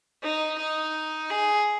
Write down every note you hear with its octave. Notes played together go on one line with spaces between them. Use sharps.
D#4
D#4
G#4